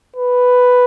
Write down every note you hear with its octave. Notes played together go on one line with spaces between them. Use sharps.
B4